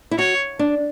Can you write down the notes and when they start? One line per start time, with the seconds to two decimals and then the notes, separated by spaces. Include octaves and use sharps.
0.11 E4
0.18 F#4 C#5
0.59 D4